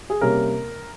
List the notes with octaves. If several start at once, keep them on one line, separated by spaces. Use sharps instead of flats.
G#4
C3 G3 A#3 C#4 A#4